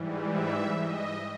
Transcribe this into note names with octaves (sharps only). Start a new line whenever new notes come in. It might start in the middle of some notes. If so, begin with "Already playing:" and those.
Already playing: G#2 E3 G3
E5
D#5